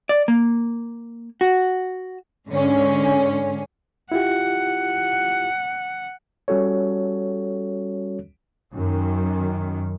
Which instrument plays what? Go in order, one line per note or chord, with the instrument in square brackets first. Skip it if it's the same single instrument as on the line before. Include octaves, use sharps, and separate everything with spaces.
[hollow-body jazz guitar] D5
A#3
F#4
[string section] G#2 D3 C#4
[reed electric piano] E4 F4 G4 [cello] F#5
[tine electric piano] G3 C#4 F#4 A4 C#5
[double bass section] F#2 D#3